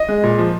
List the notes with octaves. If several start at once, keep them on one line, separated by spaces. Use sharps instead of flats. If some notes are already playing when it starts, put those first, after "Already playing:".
Already playing: D#5
G#3
A#2
F3